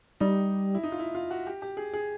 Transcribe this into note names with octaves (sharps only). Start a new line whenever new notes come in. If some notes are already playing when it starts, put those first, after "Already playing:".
G3 D#4
E4
D#4
F4
E4
F4
F#4
G4
G4
G#4
G#4